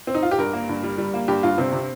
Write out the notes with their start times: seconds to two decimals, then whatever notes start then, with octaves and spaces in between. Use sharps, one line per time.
0.07 C4
0.14 D#4
0.23 F4
0.31 G4
0.38 G2 A#4
0.53 A#3
0.69 G2
0.83 G3
0.98 G3
1.14 A#3
1.28 G2 G4
1.43 G2 F4
1.58 C3 C4
1.72 C3